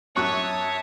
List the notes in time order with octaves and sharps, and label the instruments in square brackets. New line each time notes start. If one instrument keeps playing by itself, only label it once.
[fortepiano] F#2 C#6 F#6 [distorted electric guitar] C#5 [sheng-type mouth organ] E5 A5 D#6